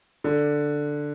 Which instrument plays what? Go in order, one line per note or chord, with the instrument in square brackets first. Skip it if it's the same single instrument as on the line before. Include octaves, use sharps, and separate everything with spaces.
[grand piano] D3